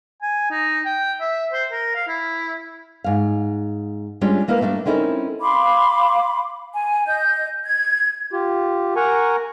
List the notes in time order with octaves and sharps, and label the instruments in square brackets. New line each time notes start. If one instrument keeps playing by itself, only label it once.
[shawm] G#5
D#4
G5
E5
C5
A#4
F5
E4
[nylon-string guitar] G#2 F5
G3 G#3 C#4 D4 F4 G4
G#3 A#3 E4 A#4 B4 F5
G3 A3 A#3 D4
C4 C#4 D#4 E4 A4 A#4
[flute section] F5 B5 C6 D6
G#5
D#5 G6
G#6
[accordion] F4 G4
A#4 F#5 G#5 A#5 C#6